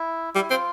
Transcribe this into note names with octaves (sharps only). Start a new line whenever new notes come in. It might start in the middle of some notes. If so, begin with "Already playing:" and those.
Already playing: E4
G3 E4
C4 F4